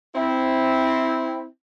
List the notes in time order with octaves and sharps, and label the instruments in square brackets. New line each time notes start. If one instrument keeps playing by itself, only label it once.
[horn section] C4 E4